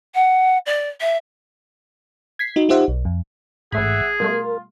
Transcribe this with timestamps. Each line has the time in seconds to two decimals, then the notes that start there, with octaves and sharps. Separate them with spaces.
0.15 F#5
0.66 D5
1.01 E5
2.39 G#6 B6 C7
2.56 D#4 F#4
2.69 D#4 F4 G4 C5 E5 F#5
2.88 B1
3.05 F2
3.72 A1 G#2 A3 G#4 E5 F#5 B5 G#6
4.20 B2 G3 A3 F4 A#4